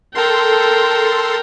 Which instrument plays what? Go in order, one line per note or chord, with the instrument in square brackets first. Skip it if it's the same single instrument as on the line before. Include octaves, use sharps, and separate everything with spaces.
[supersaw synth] A4 C6 [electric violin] A#4 G5